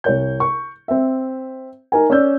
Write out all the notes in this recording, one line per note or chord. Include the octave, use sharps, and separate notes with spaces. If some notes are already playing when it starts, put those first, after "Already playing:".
C2 C#5 G6
C#6
C4 E5
D#4 A#4 G#5
C#4 D5 E6 G6